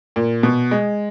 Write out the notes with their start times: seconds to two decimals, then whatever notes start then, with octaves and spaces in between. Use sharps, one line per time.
0.16 A#2
0.43 B2
0.71 G#3